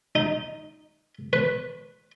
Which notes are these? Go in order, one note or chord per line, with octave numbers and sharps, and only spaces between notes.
D#4
B4